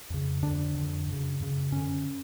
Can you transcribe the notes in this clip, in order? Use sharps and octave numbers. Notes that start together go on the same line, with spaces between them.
F2 C#3
F2 D3 D4
F2 D3
F#2
C#3
F#2 C#3
F#2 D3 C#4